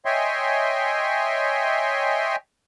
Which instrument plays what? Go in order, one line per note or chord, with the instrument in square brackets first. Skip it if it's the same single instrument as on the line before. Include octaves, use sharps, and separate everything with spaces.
[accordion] C#5 D#5 E5 G5 G#5 C6